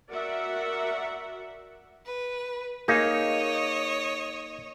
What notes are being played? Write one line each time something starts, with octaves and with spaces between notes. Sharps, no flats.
F#4 A#4 D5 E5 F#5
B4
A#3 D#4 G#4 C#5 D#5